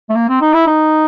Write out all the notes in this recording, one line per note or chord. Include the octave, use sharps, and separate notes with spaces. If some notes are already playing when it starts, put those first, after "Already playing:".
A3
A#3
C4
D#4
E4
D#4